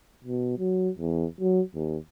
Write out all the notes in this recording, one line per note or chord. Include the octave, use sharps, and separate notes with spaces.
B2
F#3
E2
F#3
D#2